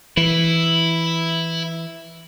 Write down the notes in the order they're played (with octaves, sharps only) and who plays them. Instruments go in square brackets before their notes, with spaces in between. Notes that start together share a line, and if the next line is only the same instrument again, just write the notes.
[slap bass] E3 [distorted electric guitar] E4